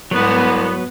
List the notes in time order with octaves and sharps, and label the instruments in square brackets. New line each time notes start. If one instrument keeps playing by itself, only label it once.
[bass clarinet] C2 [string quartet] G#2 F#4 [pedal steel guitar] F#3 B4 [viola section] B3